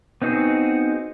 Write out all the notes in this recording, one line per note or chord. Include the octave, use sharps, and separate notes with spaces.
B3 C4 D#4 F#4 G#4